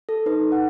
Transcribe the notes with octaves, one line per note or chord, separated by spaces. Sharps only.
A4
D#4 B4
A4
F#5